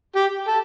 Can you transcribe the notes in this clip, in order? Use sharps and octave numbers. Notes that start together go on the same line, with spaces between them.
G4
A4